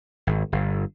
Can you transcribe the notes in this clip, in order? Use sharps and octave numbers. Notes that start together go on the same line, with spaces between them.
G#1
G1